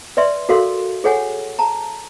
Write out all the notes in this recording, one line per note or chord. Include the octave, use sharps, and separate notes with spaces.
B4 D5 E5 C6
F#4 A4 A#4 F5 C6
G#4 A4 C#5 F#5 G#5
A5 A#5